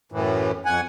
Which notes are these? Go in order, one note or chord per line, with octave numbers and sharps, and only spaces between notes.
F#2 A2 E3
F2 F#5 G#5